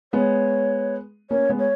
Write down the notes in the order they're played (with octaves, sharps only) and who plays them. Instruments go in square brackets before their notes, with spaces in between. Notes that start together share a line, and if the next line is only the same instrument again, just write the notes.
[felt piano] G#3 B3 [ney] C#5
[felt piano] A#3 C#4 [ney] C#5
[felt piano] G#3 B3
[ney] C#5